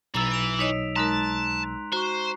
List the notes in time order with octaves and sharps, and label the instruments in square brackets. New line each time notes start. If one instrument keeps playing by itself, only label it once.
[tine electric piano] B1 E6 [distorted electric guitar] E3 [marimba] A#5 A6
[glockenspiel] D7 E7 F7
[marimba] D#4 C#5 D#5 [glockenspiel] B6
[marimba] G#3 D#4 A#4 [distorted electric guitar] A5 [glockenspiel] A#5 C6 F#6
[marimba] F#4 [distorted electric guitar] C5 [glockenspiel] A#5 C#6